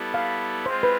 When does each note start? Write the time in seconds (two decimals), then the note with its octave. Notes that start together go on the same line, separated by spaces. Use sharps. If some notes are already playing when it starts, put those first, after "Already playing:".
Already playing: G3 B3 E4 A4
0.14 F5
0.66 G#3 C4 F4 C5
0.83 B4